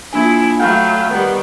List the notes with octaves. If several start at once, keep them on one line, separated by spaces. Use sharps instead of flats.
F3 A#3 D4 E4 G#5
F#3 A3 F5 G5 B5 G6
D#3 G3 B3